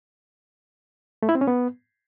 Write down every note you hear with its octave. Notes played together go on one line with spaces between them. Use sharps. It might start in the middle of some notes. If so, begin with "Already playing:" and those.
A3
E4
C4
C#4
B3